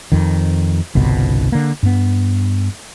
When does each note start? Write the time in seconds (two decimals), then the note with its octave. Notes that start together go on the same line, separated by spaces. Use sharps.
0.12 F2 D#3
0.95 G1 C2 B2
1.52 D3 A#3
1.83 G2 B3